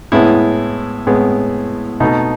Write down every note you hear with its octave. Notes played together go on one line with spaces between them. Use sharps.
A2 G#3 B3 E4
A2 G#3 B3
B2 A3 D#4